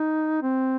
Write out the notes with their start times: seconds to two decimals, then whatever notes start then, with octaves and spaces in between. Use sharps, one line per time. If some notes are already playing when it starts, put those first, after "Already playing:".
Already playing: D#4
0.42 C4